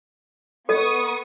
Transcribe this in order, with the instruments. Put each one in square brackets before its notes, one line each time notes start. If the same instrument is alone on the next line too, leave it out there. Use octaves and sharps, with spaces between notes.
[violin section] B3 C#6 D#6 [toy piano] A4 D#5